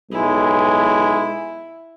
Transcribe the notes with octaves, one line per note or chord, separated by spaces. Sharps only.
B1 G#3 E4